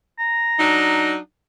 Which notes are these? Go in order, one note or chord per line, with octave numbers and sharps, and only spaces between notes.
A#5
F#3 D4 D#4